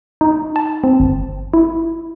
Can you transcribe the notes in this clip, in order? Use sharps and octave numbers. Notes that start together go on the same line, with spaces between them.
D#4
A5
C4
G1
E4